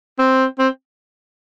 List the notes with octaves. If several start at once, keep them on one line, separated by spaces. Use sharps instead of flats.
C4
C4